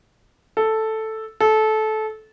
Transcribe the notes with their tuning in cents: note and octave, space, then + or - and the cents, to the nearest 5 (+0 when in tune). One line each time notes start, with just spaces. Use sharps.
A4 +0
A4 -20